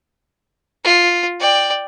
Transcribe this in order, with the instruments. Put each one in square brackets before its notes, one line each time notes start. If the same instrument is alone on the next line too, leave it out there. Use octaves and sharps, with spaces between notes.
[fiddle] F4
D5 G5